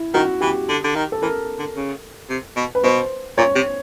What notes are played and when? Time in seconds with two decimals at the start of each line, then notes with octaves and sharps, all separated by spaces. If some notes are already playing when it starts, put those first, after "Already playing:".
Already playing: E4
0.14 D#3 F#4
0.41 E3 G4
0.69 D3
0.84 D3
0.95 D#3
1.12 A4
1.22 E3 A#4
1.59 D3
1.76 C#3
2.29 C3
2.56 B2
2.75 B4
2.83 B2 C5
3.37 A#2 C#5
3.55 C3